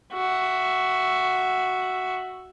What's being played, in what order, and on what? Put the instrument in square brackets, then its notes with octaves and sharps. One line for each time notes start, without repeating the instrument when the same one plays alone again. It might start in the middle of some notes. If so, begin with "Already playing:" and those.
[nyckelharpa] F#4 E5